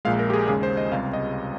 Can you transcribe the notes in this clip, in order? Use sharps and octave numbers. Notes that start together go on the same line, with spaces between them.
A#1 A#2 G#3 F5
A#4
G4
G#4
D#2 C#3 G#3 G#4
C5
D#5
C#2 C3 G3 F5
D#5